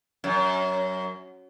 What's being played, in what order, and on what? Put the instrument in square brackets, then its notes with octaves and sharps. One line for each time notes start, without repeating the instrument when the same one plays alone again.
[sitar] F#2